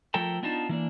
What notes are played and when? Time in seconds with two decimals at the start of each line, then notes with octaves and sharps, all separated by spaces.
0.14 F3 A3 A4 A#4 G5 A5
0.43 B3 D4 D#4 F4 A5
0.69 E3 A#3 D4